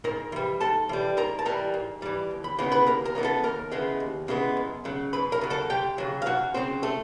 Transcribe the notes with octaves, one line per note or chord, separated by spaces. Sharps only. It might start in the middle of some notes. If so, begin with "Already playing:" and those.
G#2 A#4 A#5
E3 G3
G#2 A4 A5
E3 G3
G#2 A#4 A#5
A5
E3 G3 A#4 A#5
G#2
E3 G3
D#2
B5
C#3 E3 G#3 B3 A#5
B4 B5
D#2 A#4 A#5
A#4 A#5
C#3 E3 G#3 B3
A4 A5
D#2 A#4 A#5
C#3 E3 G#3 B3
D#2
C#3 E3 G#3 B3
F#2
C#3 F#3
F#2 B4 B5
A#4 A#5
C#3 F#3
A4 A5
F#2 G4 G5
C#3 F#3
F5
F#2 F#4 F#5
C#3 F#3 C4 C5
A3 A4